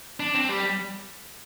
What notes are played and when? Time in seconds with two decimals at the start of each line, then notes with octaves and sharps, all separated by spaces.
0.20 D4
0.35 C4
0.49 G3